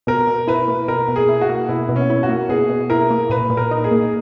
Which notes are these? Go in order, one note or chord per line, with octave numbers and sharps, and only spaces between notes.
B2 A#4
B2
E4 B4
A#3
B2 A#4
B2
G#4
E4
F#4
A#3
B2 E4
B2
C#4
E4
F#4
A#3
B2 G#4
B2
E4 A#4
A#3
A#2 B4
A#2
A#4
D#4
G#4
A#3